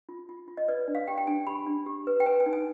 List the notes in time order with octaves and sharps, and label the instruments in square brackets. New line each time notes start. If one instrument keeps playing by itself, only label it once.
[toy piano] F4
F4
F4
D#5
B4 D5
D4
F5
G4 G5
G5
D4 G#5
G4 B5
D4
G4
B4
G5
B4 G#5
G#5
D#4
G#5